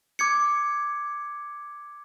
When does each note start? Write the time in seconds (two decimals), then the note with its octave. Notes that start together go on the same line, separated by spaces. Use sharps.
0.19 D6 G#6 C#7